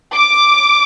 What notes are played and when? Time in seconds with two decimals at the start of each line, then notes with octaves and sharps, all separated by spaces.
0.14 D6